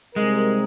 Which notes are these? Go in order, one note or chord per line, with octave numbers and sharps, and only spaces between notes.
C3 G3 G#3 C4 D#4 A#4